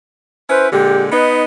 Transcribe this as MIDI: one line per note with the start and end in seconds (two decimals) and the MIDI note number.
0.50 0.68 61
0.50 0.68 64
0.50 0.68 71
0.50 0.68 72
0.72 1.10 46
0.72 1.10 50
0.72 1.10 56
0.72 1.02 67
1.12 1.45 59
1.12 1.45 63
1.12 1.43 71